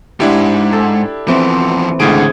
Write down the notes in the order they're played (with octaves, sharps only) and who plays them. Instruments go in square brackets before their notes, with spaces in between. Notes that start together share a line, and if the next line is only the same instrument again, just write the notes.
[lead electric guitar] D#2 G#2 [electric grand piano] D4 E4 G4
[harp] A4
[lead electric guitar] E2 F3 [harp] E3 C4
[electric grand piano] C#2 A2 D7 [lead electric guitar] D3 [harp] G#4